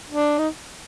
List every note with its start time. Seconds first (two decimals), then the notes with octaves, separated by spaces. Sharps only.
0.09 D4
0.39 D#4